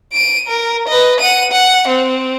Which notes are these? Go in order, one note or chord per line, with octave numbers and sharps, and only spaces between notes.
D7 D#7
A#4
B4 D#5
F#5 D#7
F#5
C4